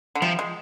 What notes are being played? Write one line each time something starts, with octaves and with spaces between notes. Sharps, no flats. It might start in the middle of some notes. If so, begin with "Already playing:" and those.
D3
C3 F3
G#3